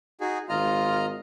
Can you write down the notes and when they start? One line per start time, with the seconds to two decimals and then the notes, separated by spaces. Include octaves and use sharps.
0.21 D#4 F#4 G#4
0.49 G#1 F4 D#5 A#5 F6